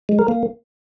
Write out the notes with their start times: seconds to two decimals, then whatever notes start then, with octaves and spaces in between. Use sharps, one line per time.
0.09 G#3
0.19 A#4
0.28 A#3